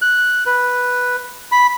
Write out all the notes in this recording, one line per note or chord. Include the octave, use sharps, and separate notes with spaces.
F#6
B4
B5